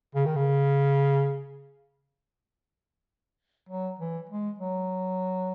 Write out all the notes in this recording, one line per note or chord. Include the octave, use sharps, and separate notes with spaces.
C#3
D#3
C#3
F#3
E3
G#3
F#3